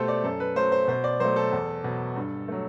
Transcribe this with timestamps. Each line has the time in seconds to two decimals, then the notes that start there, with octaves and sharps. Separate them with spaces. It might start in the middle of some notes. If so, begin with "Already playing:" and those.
Already playing: B2 A3 G4 A4 C5
0.08 D5
0.24 F#2 A4
0.40 B4
0.56 F#3 A3 C5
0.72 C5
0.88 B2 C5
1.04 D5
1.20 F#3 A3 C5
1.36 A4
1.52 E2
1.84 B2 F#3
2.16 G2
2.48 F#3 A3